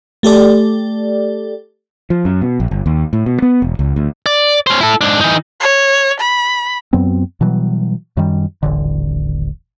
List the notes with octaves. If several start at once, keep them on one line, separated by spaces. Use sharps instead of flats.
A3 G4 A4 D5
F3
F#2
B2
A#1
G1
D#2
A2
B2
B3
E1
C#2
D2
D5
C#4 C5
E4 A4
G#2 D4
E3 D#4
C#5
B5
F#2 F#3 B3 C4
B2 E3 F#3 G3
F#2 D#3 G3
D#1 A1 D3